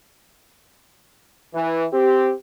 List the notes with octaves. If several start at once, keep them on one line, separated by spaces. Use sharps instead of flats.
E3
C4 G4